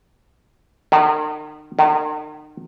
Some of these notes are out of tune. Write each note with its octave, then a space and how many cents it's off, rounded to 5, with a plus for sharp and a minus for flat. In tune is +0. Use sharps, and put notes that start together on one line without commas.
D#3 -40
D#3 -40